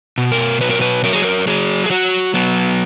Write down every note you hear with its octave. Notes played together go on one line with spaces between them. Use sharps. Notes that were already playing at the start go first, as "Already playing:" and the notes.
B2
A#4
F#3 B4
A#4
B4
F#3 A#4
G#4
A#4
F#3 G#4
G#4
F#3 F#4
F#3 B3